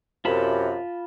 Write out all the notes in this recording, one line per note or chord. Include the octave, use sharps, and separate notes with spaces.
F#2 C3 F4 A5 B5